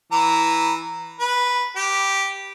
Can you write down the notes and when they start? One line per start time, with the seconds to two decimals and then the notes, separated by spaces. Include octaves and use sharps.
0.12 E3 A#5
1.20 B4
1.76 G4